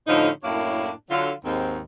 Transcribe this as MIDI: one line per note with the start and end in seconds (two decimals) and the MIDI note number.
0.07 0.30 45
0.07 0.30 50
0.07 0.30 53
0.07 0.30 61
0.07 0.30 63
0.44 0.90 42
0.44 0.90 45
0.44 0.90 58
0.44 0.90 62
0.44 0.90 64
0.44 0.90 73
1.10 1.32 50
1.10 1.32 54
1.10 1.32 65
1.45 1.80 39
1.45 1.80 44
1.45 1.80 60